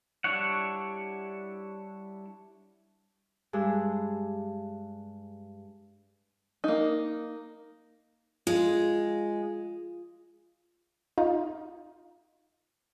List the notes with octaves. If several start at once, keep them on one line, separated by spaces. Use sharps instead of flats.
G3 D4 E4 C#5 F#5
G2 G#3 G#4 E6
A#3 D#4
G#3 F4
D#4 F4